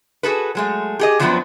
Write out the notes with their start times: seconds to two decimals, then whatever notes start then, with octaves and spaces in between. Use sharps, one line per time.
0.23 F#4 G#4 A4 B4
0.55 F#3 G#3 A3
0.99 G4 G#4 D#5
1.20 F#2 F3 F#3 B3 C4 D4